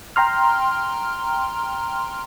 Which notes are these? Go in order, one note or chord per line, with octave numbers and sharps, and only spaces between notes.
G5 A#5 C6 F6